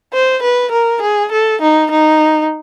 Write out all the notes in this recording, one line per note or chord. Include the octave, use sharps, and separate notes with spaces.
C5
B4
A#4
G#4
A4
D#4
D#4